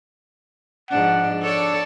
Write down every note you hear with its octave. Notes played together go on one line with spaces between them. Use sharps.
G#2 F3 D4 F#5
D4 A4 C#5 D5